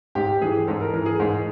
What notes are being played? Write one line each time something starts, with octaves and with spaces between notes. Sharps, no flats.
G#2 G4
E3 G#4
G#2 A4
A#4
E3 A#4
G#4
G#2